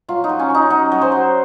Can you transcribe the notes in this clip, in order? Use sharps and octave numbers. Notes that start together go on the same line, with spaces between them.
F#3 F4
D#4
F#3
C#4
F#3 D#4
F#3 D#4
F#3
C5
F#3